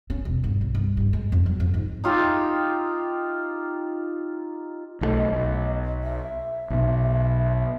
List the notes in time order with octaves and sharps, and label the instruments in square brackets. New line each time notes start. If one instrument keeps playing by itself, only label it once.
[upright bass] C#4
E1
G1
C2
G2
G2
G#3
F2
F#3
F2
G#2
[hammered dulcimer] D#4 F4 G4 E5
[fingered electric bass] B1 E3 A3 [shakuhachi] D#5
[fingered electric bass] B1
[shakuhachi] E5
[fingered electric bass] B1 B2